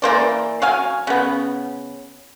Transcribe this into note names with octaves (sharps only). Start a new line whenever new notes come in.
E3 A#3 C5 D5
F#3 F5 G#5
C#3 B3